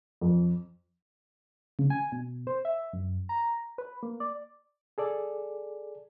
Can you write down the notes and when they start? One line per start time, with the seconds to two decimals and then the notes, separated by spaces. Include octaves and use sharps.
0.21 F2
1.79 C#3
1.90 G#5
2.12 B2
2.47 C5
2.65 E5
2.93 F#2
3.29 A#5
3.78 B4
4.03 A#3
4.20 D5
4.98 G#4 A4 D5